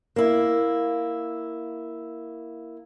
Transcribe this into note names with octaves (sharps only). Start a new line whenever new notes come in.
A#3 E4